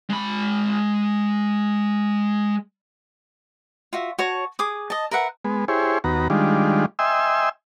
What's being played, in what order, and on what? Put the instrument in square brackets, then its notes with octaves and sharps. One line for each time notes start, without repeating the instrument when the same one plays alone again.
[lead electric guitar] G#3 B5
[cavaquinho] F4 F#4 E5
F#4 C#5 A5
G#4 D6 D#6
D#5 A5
A#4 B4 E5 F#5
[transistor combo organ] G#3 B3
E4 G4 G#4 C5 C#5
D#2 B3 F#4 A#5
D#3 G3 G#3 D4 F4
D#5 E5 G5 G#5 C6 E6